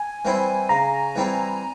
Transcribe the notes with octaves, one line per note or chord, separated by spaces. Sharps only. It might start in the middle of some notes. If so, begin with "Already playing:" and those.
Already playing: G#5
E3 G3 C4 E4
C#3 A#5
E3 G3 C4 E4